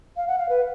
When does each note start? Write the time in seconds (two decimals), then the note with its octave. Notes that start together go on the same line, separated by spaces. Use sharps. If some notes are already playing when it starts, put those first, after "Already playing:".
0.17 F5
0.28 F#5
0.39 F5
0.49 B4